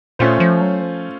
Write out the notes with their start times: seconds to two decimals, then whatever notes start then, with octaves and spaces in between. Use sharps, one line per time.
0.19 A#2 A3 C#4 F4 C5
0.40 F3
0.61 F#3
0.82 F3